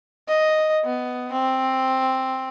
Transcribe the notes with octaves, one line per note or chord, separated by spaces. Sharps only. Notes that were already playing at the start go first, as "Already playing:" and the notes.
D#5
B3
C4